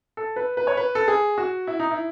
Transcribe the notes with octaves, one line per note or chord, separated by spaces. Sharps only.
A4
B4
B4
C#5
B4
A4
G#4
F#4
E4
D#4
E4